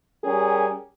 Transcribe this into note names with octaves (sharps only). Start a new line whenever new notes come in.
G3 C#4 G4 G#4 A#4